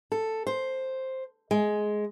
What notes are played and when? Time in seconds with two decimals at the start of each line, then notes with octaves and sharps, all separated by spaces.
0.12 A4
0.47 C5
1.51 G#3